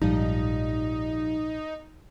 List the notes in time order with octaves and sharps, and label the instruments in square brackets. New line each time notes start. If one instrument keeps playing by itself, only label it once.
[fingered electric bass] A#1 G#2 [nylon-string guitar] F3 G3 [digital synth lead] D#4